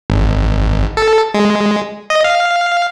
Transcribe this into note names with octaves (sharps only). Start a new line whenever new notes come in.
G#1
A4
G#3
D#5
F5